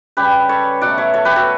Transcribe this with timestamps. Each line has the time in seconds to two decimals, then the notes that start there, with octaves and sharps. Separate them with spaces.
0.17 C#3 G3 G4 B4
0.49 A4 C#5
0.81 B2 F#3 A3 D5 F#5
0.98 C#5 E5
1.14 A4 C#5
1.25 G4 B4
1.36 F#4 A4